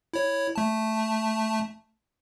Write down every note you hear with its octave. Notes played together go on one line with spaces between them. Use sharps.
E4 C#5
A3 A5